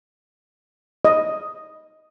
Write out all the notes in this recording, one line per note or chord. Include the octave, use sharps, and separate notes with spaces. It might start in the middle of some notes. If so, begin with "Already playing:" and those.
D#5